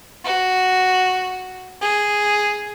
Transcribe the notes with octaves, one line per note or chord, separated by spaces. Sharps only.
F#4
G#4